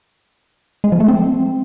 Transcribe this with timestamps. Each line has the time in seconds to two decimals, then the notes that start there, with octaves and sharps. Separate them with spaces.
0.84 G#3
0.92 F3
1.00 A3
1.08 C4